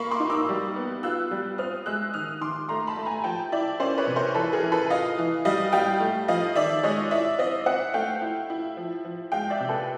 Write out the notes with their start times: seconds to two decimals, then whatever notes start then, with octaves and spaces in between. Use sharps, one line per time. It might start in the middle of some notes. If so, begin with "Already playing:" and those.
Already playing: A#3 B5 C#6
0.11 C6 D6
0.20 D#4
0.30 D6 E6
0.49 G3
0.76 B3
1.03 F4 E6 F#6
1.31 G3
1.58 C4 D#6 F6
1.86 G#3 E6 F#6
2.14 D#3 D#6 F6
2.41 D#3 C6 D6
2.69 A3 A#5 C6
2.87 A5 B5
2.97 A3
3.06 G#5 A#5
3.24 F3 G5 A5
3.52 E4 D5 E5
3.80 C#4 C5 D5
3.98 B4 C#5
4.07 C3
4.16 A#4 C5
4.34 E3 A4 B4
4.53 G#4 A#4
4.63 E3
4.72 A4 B4
4.90 F4 D#5 F5
5.18 E3
5.45 G3 D#5 F5
5.72 G3 F5 G5
6.00 A3
6.28 F3 D#5 F5
6.56 D#3 D5 E5
6.83 G#3 C#5 D#5
7.11 E4 D5 E5
7.38 C4 D#5 F5
7.66 C4 E5 F#5
7.94 A3 F5 G5
8.22 E4
8.50 E4
8.77 F3
9.05 F3
9.32 G#3 F5 G5
9.50 D5 E5
9.60 C3
9.69 A4 B4